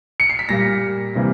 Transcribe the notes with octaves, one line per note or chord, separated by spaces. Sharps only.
C#7
C7
B6
A#2 G3 A#3 A#6
C3 E3 G3 A#3